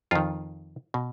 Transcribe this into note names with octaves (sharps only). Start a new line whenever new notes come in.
F2 D#3 F4
B2